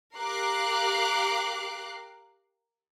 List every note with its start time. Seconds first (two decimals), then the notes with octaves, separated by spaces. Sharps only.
0.15 G4 A#4 F5 D6 F#6 C7